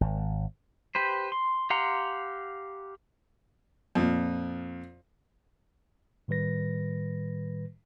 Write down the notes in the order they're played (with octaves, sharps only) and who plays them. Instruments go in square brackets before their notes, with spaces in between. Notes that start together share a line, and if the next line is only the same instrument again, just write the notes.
[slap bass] G#1
[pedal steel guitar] G4 B4 C5
C6
G4 F5 F#5 A#5 C6
[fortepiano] F2 A#2
[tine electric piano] A2 D#3 G3 B4 A#6